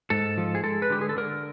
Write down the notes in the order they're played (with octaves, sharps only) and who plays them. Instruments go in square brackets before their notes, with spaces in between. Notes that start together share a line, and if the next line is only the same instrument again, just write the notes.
[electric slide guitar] G#2 A4
F3
G#4
G#3 A4
B4
D3 G4
G#4
A4
D3 A#4